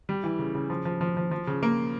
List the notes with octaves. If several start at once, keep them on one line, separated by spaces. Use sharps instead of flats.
G3
E3
C#3
C#3
F3
F3
F3
F3
F3
C#3
A#3